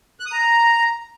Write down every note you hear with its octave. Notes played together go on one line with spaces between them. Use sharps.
F#6
D#6
A#5